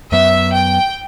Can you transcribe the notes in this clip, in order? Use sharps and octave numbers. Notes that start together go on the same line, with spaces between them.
F#2 F#3 B3 E5
G5